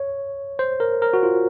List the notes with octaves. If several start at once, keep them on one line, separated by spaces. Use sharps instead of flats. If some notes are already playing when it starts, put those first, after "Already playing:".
Already playing: C#5
C5
A#4
A#4
F#4
F4